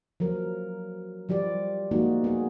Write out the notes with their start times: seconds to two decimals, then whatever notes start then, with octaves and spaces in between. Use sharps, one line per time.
0.20 F3 F#3 A#4
1.29 F3 G3 F4 D5
1.91 F3 G#3 A#3 D#4 F#4
2.24 B3 G#4